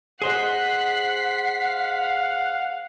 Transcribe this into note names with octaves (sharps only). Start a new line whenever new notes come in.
G#4 C5 D#5 F#5 F#6 B6 C7
F5